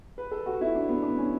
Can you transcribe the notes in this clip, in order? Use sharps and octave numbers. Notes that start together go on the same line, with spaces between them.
B4
A4
F#4
E4
D4
B3
D4
C#4